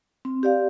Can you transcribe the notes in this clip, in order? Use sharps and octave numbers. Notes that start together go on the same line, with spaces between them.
C4
G4 D5 F5